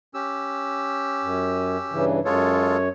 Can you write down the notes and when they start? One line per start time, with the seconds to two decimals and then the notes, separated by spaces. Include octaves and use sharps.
0.14 C#4 G4 E6
1.22 F#2
1.92 G2 C#3 E3
2.25 F#2 G#3 F4 A4 C#5